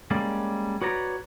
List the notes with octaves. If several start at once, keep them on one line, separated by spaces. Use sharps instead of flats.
G3 G#3 A#3 C#4 D5
F#4 B4 C#5 D5 A#5